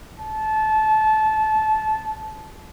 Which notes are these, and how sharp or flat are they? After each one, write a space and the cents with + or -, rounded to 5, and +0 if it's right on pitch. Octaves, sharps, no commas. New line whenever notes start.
A5 -20